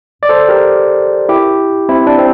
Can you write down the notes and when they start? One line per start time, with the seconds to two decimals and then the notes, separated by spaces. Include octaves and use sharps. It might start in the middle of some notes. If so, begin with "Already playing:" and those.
0.23 D5
0.29 A4 C5
0.49 G4 A#4
1.29 E4 G4
1.89 C4 E4
2.07 D4
2.18 C4